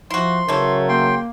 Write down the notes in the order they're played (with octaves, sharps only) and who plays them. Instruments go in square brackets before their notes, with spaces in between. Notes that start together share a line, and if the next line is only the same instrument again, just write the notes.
[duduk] F3 [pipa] E4 F#4 [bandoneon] C6
[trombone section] C#3 F#3 A#4 [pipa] E3 A3 [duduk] C#5
[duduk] A#3 [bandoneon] G5 C6